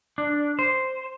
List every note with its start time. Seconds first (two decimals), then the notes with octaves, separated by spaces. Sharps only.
0.18 D4
0.59 C5